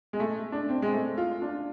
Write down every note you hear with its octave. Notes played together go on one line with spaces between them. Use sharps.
G#3
A3
D4
C4
G#3
A3
F4
D4